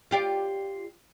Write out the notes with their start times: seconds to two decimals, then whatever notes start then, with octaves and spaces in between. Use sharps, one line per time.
0.11 F4 G4 D5